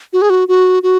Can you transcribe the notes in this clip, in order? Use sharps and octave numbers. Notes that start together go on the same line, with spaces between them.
F#4
G#4
F#4
F#4
F#4